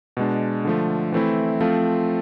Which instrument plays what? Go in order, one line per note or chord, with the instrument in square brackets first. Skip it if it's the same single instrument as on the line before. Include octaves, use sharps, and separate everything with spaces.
[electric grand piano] B2 G#3 D4
D3 F3 A3
E3 A3 C4 E4
F3 A3 C4 F4